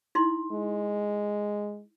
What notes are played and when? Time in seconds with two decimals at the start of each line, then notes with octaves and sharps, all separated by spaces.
0.15 D#4 E4 C6
0.52 G#3